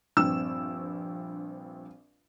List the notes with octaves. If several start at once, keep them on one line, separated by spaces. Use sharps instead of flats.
A#1 G2 C4 E6